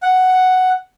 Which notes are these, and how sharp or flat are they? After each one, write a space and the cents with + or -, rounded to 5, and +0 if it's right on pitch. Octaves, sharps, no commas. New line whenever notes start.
F#5 +5